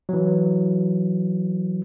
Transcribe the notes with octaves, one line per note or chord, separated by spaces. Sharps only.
E3 F#3